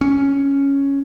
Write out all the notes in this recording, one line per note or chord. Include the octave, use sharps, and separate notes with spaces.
C#4